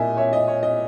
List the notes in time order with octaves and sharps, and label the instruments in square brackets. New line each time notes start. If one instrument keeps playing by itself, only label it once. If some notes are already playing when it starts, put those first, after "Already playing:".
Already playing: [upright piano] A#2 A#3 E4 D#5 E5 G#5
C#5 E5
D#5
C#5
D#5